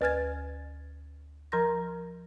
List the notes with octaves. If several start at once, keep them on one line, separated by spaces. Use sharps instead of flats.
D2 B4 G#5 F6 G#6 A6
F3 A#4 A#5 C6 G6 A#6